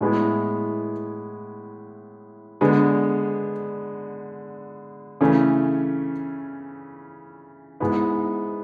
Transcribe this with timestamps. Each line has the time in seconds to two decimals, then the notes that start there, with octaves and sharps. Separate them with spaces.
0.01 A2 G#3 B3 E4
2.61 D3 G#3 B3
5.21 C#3 E3 A3 C#4
7.80 G#2 G#3 B3 E4